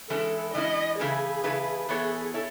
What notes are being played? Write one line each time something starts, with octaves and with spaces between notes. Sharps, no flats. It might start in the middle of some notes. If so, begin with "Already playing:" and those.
E3 G#3 C#4 E4 A4
E3 G#3 C#4 E4 D#5
C#3 E3 A3 E4 G#4 B4
C#3 E3 A3 E4 B4
E3 B3 E4 G#4 A4 C#5
E4 A4 C#5